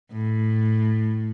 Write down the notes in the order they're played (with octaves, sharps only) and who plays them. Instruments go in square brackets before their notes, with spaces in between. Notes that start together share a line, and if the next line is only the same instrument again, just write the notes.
[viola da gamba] A2